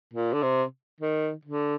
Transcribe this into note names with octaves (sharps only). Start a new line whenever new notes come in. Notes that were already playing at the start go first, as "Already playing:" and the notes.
A#2
D3
C3
D#3
D3